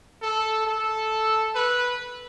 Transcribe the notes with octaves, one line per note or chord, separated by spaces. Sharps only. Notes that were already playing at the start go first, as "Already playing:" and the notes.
A4
A4
B4